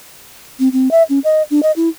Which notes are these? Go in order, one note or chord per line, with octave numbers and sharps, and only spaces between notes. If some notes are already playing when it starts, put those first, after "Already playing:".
C4
C4
E5
C#4
D#5
D4
D#5
E4